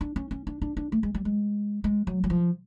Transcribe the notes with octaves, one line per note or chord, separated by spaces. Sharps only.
D4
C#4
C#4
D4
D4
D4
A3
G#3
G3
G#3
G#3
F#3
F#3
F3